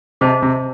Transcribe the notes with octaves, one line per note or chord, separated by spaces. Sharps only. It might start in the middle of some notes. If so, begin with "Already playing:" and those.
C3 G#4 C5 D#5 A5
C3